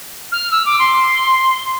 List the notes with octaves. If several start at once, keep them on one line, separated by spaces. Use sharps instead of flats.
F6
E6
D6
C6